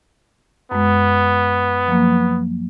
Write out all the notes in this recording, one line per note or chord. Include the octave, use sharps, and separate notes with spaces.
F#2 G#3 B3
F3 F#3 A#3